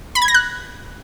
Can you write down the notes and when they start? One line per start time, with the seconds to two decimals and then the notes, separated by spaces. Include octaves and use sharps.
0.15 B5
0.22 G#6
0.28 A#6
0.34 F#6